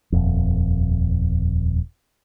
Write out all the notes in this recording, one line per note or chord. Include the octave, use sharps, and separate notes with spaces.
D#1 F2